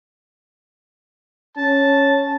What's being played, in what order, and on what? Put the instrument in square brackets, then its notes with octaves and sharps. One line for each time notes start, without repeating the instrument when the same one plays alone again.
[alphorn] C#4 [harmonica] A5